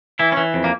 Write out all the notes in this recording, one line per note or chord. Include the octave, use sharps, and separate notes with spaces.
E3 E4
C#4
E3
F2
A#3